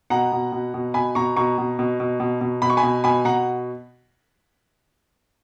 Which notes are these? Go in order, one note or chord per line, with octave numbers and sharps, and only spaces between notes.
B2 F#5 A#5
B2
B2
B2
B2 G#5 B5
B2 A#5 C#6
B2 A#5 C#6
B2
B2
B2
B2
B2
B2 B5
C#6
G#5 B5
B2
B2 G#5 B5
B2 F#5 A#5